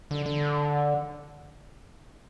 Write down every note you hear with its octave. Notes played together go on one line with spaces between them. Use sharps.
D3
D3